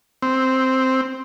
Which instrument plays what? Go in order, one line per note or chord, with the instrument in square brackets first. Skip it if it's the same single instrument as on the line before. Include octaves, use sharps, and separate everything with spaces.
[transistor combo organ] C4